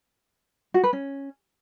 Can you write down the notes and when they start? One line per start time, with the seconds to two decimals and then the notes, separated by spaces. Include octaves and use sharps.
0.74 F#4
0.84 B4
0.93 C#4